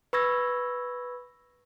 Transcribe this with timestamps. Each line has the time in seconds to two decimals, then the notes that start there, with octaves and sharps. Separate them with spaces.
0.13 B4 B5 C#6 E6 G#6 A#6